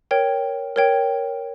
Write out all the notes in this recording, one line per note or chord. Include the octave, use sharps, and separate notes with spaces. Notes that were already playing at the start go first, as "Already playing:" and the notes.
A#4 C#5 G5
A#4 C#5 G5